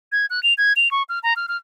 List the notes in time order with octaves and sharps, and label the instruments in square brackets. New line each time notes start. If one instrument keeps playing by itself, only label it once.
[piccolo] G#6
F#6
F7
G#6
F7
C#6
F6
A#5
F6
F6